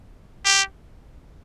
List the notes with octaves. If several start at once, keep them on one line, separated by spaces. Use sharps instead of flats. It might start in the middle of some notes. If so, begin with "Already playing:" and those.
G4